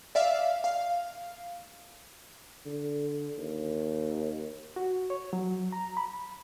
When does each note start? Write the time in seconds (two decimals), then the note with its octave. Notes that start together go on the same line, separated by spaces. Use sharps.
0.15 D5 E5 F5
0.64 F5
2.66 D3
3.38 D#2
4.76 F#4
5.10 C#5
5.33 F#3
5.72 A#5
5.97 B5